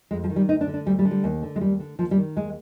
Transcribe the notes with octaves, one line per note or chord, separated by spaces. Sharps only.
F2 G#3
F3
D#3
G3
D2 D#4
D4
D3
D4
D2 G3
G3
D3
G3
D#2
D3
G#3
D#2 G3
D3
D#2 F3
G3
D#3
D#2 G#3